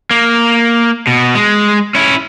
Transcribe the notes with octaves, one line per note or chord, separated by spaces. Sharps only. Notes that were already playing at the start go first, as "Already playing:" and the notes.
A#3
B2
G#3
C#4 E4